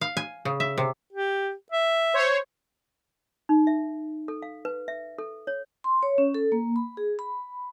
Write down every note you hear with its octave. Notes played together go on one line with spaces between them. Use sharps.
F5
G#5
C#3
E5
C3
G4
E5
C5 C#5
D#4
E5
A4
F5
B4
E5
A4
C#5
C6
C#5
C#4
A4
A#3
B5
G#4
B5